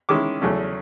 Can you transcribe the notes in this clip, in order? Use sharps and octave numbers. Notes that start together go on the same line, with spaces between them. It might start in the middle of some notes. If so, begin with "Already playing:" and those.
D#3 G#3 C#4 E4 D6
E2 C#3 F#3 A3 C#4